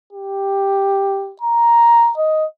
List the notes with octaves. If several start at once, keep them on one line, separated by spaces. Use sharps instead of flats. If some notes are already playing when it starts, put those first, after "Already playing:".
G4
A#5
D#5